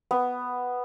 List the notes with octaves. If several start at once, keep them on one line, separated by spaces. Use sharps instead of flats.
B3